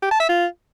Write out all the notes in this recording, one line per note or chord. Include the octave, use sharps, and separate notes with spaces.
G4
A5
E5
F4